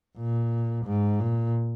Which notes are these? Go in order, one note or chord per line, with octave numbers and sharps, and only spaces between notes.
A#2
G#2
A#2